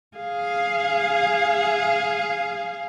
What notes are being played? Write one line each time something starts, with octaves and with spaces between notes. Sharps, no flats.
G#4 F5